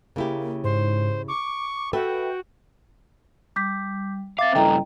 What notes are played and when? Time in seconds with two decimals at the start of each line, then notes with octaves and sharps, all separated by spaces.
0.16 C#3 A#3 E4 G4
0.64 G#2 C5
1.28 C#6 D6
1.93 F#4 A4 B4 E5 G5
3.56 G3 D6 G6 B6
4.39 C4 E5 F5 D6 A6
4.55 G2 C#3 E4 A4 D#5 G5 A#5